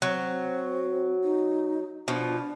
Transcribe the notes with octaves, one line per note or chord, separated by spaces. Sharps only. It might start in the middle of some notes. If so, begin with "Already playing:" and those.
F#3 C4
D#4
B2 F3 D4